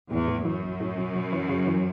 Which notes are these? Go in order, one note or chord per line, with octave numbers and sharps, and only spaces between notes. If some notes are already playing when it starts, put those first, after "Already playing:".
E2 A2
A2
F#2 E3
B1
A2
B1
B1
E3
C#3
E3